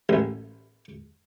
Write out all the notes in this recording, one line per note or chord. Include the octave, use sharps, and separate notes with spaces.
A1